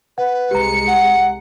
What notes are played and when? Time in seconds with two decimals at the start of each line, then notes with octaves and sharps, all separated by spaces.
0.18 B4 F#5
0.51 C2 G#3 G4 A#5 C#7
0.87 F#5